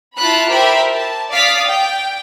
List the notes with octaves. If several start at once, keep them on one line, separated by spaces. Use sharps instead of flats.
E4 F4 A5 B5 F#6
G4 A#4 C5 E5 B5
A5
D5 F5 D6 D#6 A6 B6
G5